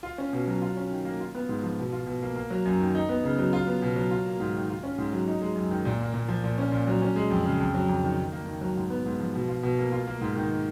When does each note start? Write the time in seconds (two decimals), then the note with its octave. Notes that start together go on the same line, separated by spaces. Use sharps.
0.03 F4
0.18 C#4
0.33 B2
0.47 F#3
0.62 F4
0.77 C#4
0.91 D#3
1.05 A#3
1.20 F4
1.35 B3
1.49 G#2
1.63 F3
1.79 B2
1.92 F4
2.07 B2
2.22 A#3
2.36 A#3
2.50 F#3
2.65 F#2
2.80 D#3
2.95 D#4
3.09 B3
3.24 C#3
3.38 F#3
3.53 F4
3.67 B3
3.82 B2
3.96 F#3
4.11 F4
4.25 A#3
4.40 G#2
4.55 D#3
4.69 F4
4.83 C#4
4.98 G#2
5.13 F#3
5.28 D#4
5.41 G#3
5.56 F#2
5.71 D#3
5.85 A#2
6.00 A#3
6.14 A#2
6.28 F3
6.44 A#2
6.58 C#4
6.72 A#2
6.87 F#3
7.02 C#4
7.16 G#3
7.30 F2
7.45 C#3
7.60 F2
7.75 F#3
7.89 F2
8.03 D#3
8.18 D#3
8.32 A#3
8.47 D#3
8.61 F#3
8.76 G#2
8.90 B3
9.06 G#2
9.20 F3
9.35 B2
9.48 F4
9.63 B2
9.78 A#3
9.92 F4
10.08 A#3
10.21 G#2
10.36 D#3